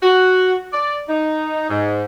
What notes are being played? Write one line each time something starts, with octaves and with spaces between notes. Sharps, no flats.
F#4
D5
D#4
G#2